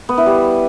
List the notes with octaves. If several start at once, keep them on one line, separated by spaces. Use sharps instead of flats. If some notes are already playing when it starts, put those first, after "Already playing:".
B3
E4
G3